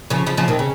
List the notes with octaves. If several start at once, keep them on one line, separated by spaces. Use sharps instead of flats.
C#3 F3
C#3 F3
C#3 F3
C3 D#3
C#3